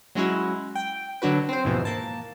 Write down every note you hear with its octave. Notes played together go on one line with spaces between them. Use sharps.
F#3 G#3 C#4 E4 F#4
G5
D3 F#3 D4 F#4 B4
C4 C5
D#2 G#2 B2 E3 F3
A#3 A5